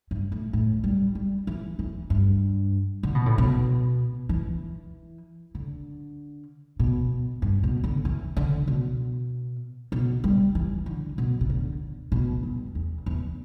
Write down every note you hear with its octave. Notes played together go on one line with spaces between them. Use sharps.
G2
A2
A2
G3
G3
E3
E3
G2
D3
B2
A2
B2
E3
D3
B2
G2
B2
D3
E3
D3
B2
B2
G3
E3
D3
B2
B2
D3
B2
G2
E2
E2